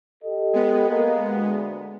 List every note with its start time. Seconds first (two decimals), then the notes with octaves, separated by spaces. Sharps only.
0.24 G4 A4 D#5
0.53 G#3 B3
0.89 A#3 A#4 D#5
1.33 D2